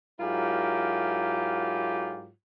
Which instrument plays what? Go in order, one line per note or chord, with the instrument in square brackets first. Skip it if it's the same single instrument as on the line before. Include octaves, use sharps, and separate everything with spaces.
[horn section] G#2 F#3 E4 F4 G4 A#4